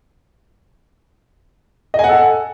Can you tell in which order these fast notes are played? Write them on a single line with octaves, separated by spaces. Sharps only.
D#5 G#5 F#5 A4